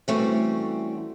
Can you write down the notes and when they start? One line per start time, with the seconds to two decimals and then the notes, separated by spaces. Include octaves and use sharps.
0.08 E3 G3 A3 C4 C#4 F#4